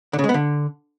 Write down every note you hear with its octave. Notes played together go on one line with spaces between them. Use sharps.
D3
C#3
G#3
B3
D3